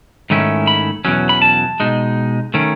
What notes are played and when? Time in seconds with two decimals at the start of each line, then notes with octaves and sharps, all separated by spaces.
0.30 G#2 D#3 A3 C#4 E4
0.67 B5
1.05 E2 B2 F#3 C#4
1.29 B5
1.42 A5
1.80 B2 G#3 D#4
2.54 D#3 A3 C#4